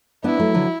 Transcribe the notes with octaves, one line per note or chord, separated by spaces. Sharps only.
B3 D4 E4
F#3 A3
D3 F#3